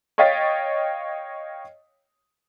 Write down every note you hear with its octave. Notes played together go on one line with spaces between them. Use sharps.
C#5 D#5 F5 G5 A6 B6